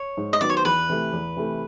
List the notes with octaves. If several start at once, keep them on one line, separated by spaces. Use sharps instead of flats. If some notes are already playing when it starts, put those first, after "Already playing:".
Already playing: C#5
G#2
D#5
D#3 F#3 B3 D5
C#5
C5
E2 B4
C3 E3 A3
E2
C3 E3 A3